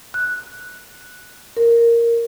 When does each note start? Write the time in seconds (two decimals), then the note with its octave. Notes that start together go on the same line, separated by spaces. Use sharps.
0.14 F#6
1.57 A#4